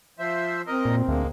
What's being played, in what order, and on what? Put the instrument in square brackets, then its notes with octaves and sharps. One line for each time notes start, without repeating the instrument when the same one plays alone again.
[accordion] F3 C5 E5
[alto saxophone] C4 [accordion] A#4 D#5
[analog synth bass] A#2
[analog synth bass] D2 [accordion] G#3 A#3